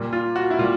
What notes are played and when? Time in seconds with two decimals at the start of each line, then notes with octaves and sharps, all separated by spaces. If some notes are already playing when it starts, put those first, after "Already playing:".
Already playing: A#2 G3
0.13 F4
0.36 F#4
0.50 E4
0.59 A#2 G3 F4